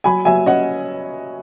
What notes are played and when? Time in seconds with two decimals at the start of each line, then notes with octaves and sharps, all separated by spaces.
0.04 F#3 G#5 B5
0.25 F#3 E5 G#5
0.46 C#4 D#5 F#5